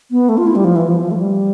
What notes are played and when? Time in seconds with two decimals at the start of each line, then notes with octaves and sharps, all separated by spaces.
0.11 B3
0.29 A3
0.38 F4
0.46 E4
0.55 G3
0.64 F3
0.76 E3
0.88 F3
1.00 F3
1.11 A3
1.18 G3